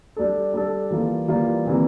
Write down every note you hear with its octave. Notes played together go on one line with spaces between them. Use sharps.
G3 D4 A4
G3 D4 A4
E3 G3 A#3 F4
E3 G3 A#3 F4
C3 E3 G3 A#3